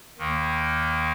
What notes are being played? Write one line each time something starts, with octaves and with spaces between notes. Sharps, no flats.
D#2 D#3 A#3